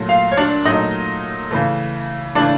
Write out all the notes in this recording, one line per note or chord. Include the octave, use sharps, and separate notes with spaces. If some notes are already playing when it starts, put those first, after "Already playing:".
Already playing: A#2 F#3 A3
F4 F5
C#5
D4 D5
A#2 F#3 A3 D#4 D#5
C#3 E3 A3
C#3 E3 A3 D4 D5